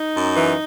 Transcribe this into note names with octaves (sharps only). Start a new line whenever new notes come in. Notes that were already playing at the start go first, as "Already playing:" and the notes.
Already playing: D#4
F#2
E3